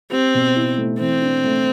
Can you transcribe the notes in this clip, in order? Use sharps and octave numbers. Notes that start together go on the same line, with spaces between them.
C4 G4
B2
E4
A3
E3 C4
D4
A3